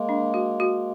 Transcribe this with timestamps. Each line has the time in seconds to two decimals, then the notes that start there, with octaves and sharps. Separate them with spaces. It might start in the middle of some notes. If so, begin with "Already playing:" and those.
Already playing: G#3 A#3
0.09 D4
0.34 F#4
0.60 F#4